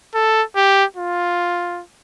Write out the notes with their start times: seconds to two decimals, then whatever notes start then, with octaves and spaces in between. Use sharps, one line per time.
0.15 A4
0.56 G4
0.96 F4